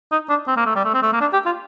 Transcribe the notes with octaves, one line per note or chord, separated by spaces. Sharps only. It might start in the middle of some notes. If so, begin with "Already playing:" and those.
D#4
D4
C4
A#3
A3
G3
A3
C4
A3
A#3
D4
G4
F4